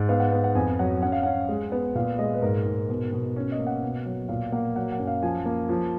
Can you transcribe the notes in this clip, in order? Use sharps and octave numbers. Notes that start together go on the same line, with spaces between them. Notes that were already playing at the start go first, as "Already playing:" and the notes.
Already playing: G#2
B3 F5
F#5
B3
F#5
F2 G#5
F#3 F#5
C#4 F#5
F5
C#4 F#5
G#3
B3
A#2 F5
G#3 D#5
B4
G#2 A#4
G#2
B2
B2
C#4 C#5
D#5
A#3
F#5
B2
F#3
A#2 F5
A#3 F#5
F#3 F#5
F#5
F#2
F5
F3 G#5
A#3
F3